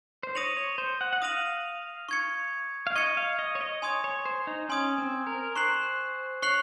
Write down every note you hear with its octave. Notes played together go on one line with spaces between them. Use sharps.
C5
C#5 D#6 A#6 D#7 F#7
C#5
C5
F#5
F#5
F5 D#6 A#6 D#7 F#7
C#6 G#6 C#7
F5
D#5 C#6 G#6 C#7
F5
D#5
C#5
D#5
C#5 G#5 C6 D#6 G#6
C#5
C5
D#4
C#4 G#5 C6 D#6 G#6
C4
A#4
C5 C#6 F#6 C7 F#7
C#5 C#6 F#6 C7 F#7